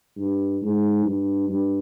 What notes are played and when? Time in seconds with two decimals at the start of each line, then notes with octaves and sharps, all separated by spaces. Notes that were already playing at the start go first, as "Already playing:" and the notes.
0.17 G2
0.62 G#2
1.06 G2
1.49 G2